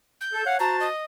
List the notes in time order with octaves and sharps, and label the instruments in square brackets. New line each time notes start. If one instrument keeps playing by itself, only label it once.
[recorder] G6
[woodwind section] A4
C#5 F5 F#5
[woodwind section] F#4 C5 A5 [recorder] A#5
[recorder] D#5